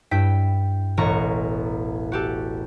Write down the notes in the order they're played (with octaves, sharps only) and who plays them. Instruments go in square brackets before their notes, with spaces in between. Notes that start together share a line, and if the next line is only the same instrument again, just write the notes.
[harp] G2 E4 G5 B6
E1 A1 A#5 C#6
F#4 G4 A4